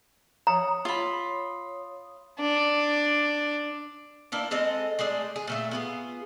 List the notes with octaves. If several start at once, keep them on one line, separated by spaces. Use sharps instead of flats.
C#5 A#5 D#6
F4 B5
D4
A#3 D4 E4 B4
G#3 C4 A4 D#5
G#3 A3 G#4 D5
G#4
A#2 A3 E5
B3 F4 G#4